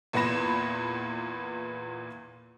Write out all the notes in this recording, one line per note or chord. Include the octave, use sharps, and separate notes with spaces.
E2 A#2 B3 B5 A#6 E7